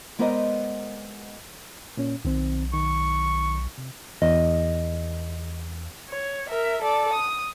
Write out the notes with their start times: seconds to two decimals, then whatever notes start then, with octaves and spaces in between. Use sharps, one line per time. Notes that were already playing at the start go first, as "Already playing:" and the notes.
0.19 G#3 B3 A#4 C5 D5 D#5
1.97 A#2 C#4
2.25 B1 D#3 C4
2.73 D#3 C#6
3.78 C3
4.22 E2 D#5
6.09 C#5
6.49 A#4 E5
6.82 A4 D5
7.13 D#6